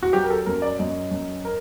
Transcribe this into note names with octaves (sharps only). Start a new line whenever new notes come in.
F#4
F#3 G4
A#4
A4
F#2 A#4
D5
F#2 D#5
F#2
A#4